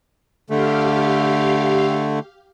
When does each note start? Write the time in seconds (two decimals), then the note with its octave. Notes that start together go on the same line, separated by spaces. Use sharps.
0.50 D3 A3 G4 F5